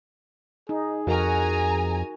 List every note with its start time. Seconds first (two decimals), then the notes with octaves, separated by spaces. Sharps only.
0.69 D#4 G#4
1.07 F2 F#4 A#4 G#5 A#5